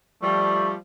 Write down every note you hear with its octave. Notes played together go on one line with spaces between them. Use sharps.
F3 G3 A3